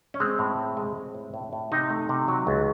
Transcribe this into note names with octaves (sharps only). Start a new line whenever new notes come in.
C#4
G#3 C4
A2
G#3
G#3
G#3
A2
A2
A2
C3 D#4
A3
C3
F#3
C#2